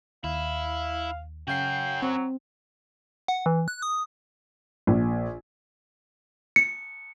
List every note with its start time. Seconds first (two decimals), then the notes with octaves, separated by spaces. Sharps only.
0.24 D#2 E4 F5
1.48 C#3 C#4 F#4 F5 G5 C7
2.02 F#3 C4
3.28 F#5
3.46 E3
3.68 F#6
3.82 D#6
4.87 A#1
6.56 C#7